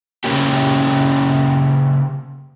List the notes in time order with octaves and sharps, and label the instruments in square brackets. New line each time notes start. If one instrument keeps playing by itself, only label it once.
[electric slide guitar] C#3 A#3 C#4 G4